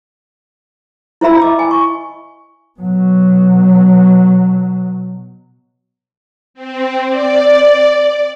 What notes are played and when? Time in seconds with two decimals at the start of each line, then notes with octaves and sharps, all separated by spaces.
1.21 E4 C5 E5 B5 E6
1.42 D#5 D6
1.59 G#5
1.71 C#6
2.79 B2 F#3
6.54 C4
7.08 D5